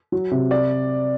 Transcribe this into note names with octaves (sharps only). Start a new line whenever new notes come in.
F#3
C3
D5